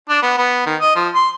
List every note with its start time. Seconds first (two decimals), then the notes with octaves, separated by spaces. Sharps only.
0.09 D4
0.22 B3
0.38 B3
0.66 D#3
0.82 D#5
0.96 F3
1.15 C6